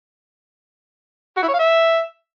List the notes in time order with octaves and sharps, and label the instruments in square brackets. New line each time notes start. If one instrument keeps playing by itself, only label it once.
[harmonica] F#4
E4
C#5
F5
E5